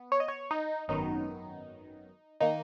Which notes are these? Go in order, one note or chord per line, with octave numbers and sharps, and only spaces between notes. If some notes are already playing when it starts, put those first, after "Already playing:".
Already playing: B3
C#5
D#5
C#5
D#4
G#1 F#2 D#3 F#3 B3 D#4
D#3 A#3 D#4